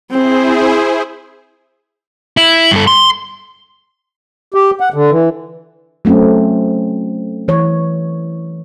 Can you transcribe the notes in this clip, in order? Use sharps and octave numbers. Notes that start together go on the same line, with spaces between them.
C4 E4 G#4 C5
E4
G2 A4
C6
G4
F#5
D3
E3
F#3 A3 C4 C#4
E3 C#5